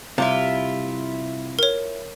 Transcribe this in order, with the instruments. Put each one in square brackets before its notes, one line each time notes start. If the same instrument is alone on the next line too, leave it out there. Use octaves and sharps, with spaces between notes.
[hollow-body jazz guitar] C3 G3 [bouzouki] E4 F4
[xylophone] A#4 C#5